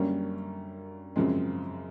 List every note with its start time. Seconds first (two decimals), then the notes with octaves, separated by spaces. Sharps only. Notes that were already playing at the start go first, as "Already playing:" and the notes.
Already playing: F#2 D3 G3 A#3 C#4
1.16 F#2 C#3 F3 G#3 C4